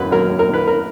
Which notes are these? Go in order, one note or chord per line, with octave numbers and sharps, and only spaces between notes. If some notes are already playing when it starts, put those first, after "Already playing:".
Already playing: F#2 F#3 B4
F#3 A#4
F#2
A#4
F#2 B4
A#4